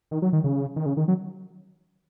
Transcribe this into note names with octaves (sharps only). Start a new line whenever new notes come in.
D#3
F#3
D#3
C#3
D#3
C#3
D#3
F#3